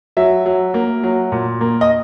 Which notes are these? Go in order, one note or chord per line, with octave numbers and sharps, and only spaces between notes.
F#3 E5
F#3
A#3
F#3
A#2
A#3
D#5